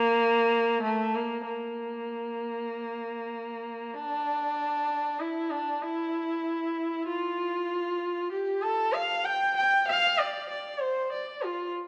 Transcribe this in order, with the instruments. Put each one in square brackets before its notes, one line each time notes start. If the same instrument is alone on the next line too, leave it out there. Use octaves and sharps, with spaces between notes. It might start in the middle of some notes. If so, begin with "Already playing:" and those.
Already playing: [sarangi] A#3
A3
A#3
A#3
D4
E4
D4
E4
F4
G4
A4
F5
G5
G5
F5
D5
D5
C5
D5
F4